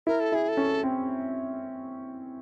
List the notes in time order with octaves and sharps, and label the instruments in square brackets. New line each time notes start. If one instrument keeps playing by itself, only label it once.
[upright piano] E4 [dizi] A#4
[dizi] A4
[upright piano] E4 [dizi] G#4
[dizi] A4
[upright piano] C#4
C4